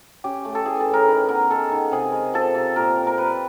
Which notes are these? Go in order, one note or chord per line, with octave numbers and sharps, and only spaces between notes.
C#4 G4
A3
A4
E3 G#4
A4
A2
A#4
D#3 B4
B3 A#4
G#3 A4
D#3
C3 G#4
G#3
F3 A4
C3
A#2 A#4
C4
A#4
G3 B4